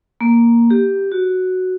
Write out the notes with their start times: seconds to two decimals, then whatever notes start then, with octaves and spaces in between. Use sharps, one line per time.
0.21 A#3
0.71 G4
1.12 F#4